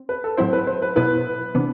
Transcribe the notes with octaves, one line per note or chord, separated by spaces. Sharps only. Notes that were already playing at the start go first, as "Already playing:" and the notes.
Already playing: C4
B4
A4
A2 F#3 C4 E4 C5
B4
C5
B4
B2 F#3 B3 E4 B4
C3 E3 B3 D4